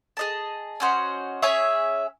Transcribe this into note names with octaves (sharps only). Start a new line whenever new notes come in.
G#4 D#5 A5
C#4 F#4 C5 D#5
C#4 G#4 C#5 E5